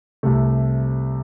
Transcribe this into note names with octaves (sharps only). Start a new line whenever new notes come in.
C2 C3 A3